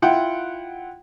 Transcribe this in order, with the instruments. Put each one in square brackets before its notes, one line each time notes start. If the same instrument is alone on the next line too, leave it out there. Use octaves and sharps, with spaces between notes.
[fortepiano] E4 F4 F#5 G5